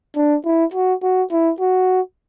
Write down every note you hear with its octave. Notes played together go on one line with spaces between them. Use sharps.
D4
E4
F#4
F#4
E4
F#4